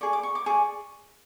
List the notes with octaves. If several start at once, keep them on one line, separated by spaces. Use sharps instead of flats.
G#4 D5 C#6
D6
C#6
D6
G#4 D5 C#6